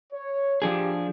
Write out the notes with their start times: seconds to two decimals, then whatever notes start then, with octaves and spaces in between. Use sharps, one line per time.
0.13 C#5
0.62 F3 D4 G4 G#4